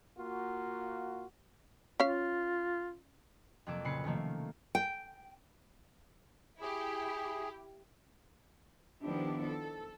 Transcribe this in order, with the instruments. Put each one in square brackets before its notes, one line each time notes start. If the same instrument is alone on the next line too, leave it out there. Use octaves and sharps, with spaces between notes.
[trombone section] A#3 F4 F#4
[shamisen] C#4 F5 [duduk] F4
[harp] F2 C3 F#3 A#3 D6 E6
A#2 C#3 B4 C7 C#7
C3 D#3 F3 A3 A#3
[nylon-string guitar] G5
[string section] E4 G4 [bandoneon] G#4
[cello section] D#3 F3 B3 D4 E4 G4
A4